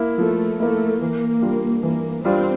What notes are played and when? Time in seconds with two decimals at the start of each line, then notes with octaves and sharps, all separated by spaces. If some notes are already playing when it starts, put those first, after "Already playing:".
Already playing: A#3 E4
0.18 F3 A3
0.60 A3 A#3 E4
1.00 E3 A#3
1.42 G3 D4 F4
1.83 E3 A#3
2.24 G3 C4 D4 F4